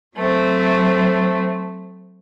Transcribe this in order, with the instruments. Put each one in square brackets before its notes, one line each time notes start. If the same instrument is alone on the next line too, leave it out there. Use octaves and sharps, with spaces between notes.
[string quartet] F#3 A3 C4